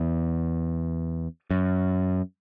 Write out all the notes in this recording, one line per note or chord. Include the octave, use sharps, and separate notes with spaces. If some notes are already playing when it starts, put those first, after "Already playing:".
Already playing: E2
F#2